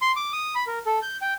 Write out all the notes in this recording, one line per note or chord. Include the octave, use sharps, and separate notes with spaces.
C6
D6
D#6
B5
A#4
A4
G6
G5